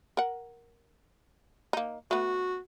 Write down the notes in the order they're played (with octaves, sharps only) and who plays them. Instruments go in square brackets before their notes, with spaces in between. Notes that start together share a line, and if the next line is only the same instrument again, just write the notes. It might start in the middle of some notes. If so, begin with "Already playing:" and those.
[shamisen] A#4 F#5
A#3 D#4
[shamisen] A3 B3 [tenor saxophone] F#4